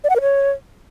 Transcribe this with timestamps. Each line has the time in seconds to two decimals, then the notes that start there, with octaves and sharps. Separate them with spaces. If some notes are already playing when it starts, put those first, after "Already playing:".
0.04 D5
0.10 F#5
0.16 A#4
0.21 C#5